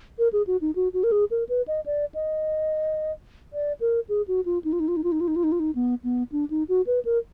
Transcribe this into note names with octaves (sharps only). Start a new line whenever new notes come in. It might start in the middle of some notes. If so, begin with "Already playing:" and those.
A#4
G#4
F#4
D#4
F#4
F#4
A#4
G#4
A#4
B4
D#5
D5
D#5
D5
A#4
G#4
F#4
F4
D#4
F4
D#4
F4
D#4
F4
D#4
F4
D#4
F4
D#4
F4
D#4
B3
B3
D4
D#4
F#4
B4
A#4